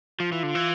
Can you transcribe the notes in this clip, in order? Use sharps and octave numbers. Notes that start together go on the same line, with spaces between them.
F3 F4
E3
D3
E3